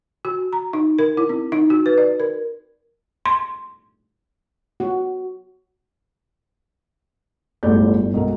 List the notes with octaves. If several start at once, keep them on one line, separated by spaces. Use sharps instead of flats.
F#4
A#5
D#4
A#4
E4
C4
D#4
F#4
B4
D5
A#4
C6
F#4
G1 C2 A2 G#3 D5 G6
G1
B1 G#2 A#4